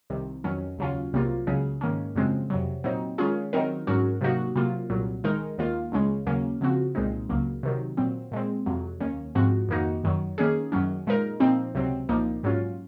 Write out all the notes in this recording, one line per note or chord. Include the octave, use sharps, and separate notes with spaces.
C2 C3 D#3
F2 D#3 F#3 C#4
D#2 C#3 F#3 C#4 F4
C2 C3 F#3 A#3 F4
C#2 C#3 F#3 C#4 G#4
G#2 D#3 A#3 C#4
F#2 C#3 F3 G#3 C4
F2 C3 F#3
A#2 F#3 C4 D#4
D#3 G#3 C#4 F4 G#4
D#3 F#3 C4 D#4 A#4
G#2 F#3 C#4 F#4 A#4
C3 F#3 A#3 D#4 F#4
C3 F#3 A#3 F4
C2 A#2 F#3
D#3 G#3 D#4 A#4
D#2 D#3 A#3 F4
C#2 C#3 G#3 C#4
D#2 C#3 F#3 A#3 C#4
C#3 F3 C4 F#4
C2 A#2 G#3 C4 D#4
C#2 C#3 F#3 A#3
C3 D#3 F#3
A#2 F#3 C4
A#2 G#3 C4
F2 C3 F#3
D#2 D#3 A#3 C#4
G#2 F3 C4 F#4
F2 D#3 A#3 D#4 F#4
F#2 D#3 F#3
D#3 A#3 C#4 G#4
F#2 D#3 F#3 C#4
A#2 G#3 D#4 A#4
A#2 F3 C4 D#4
C#2 C3 F#3 C4
C2 A#2 F3 A#3 D#4
G#2 F#3 C#4 F4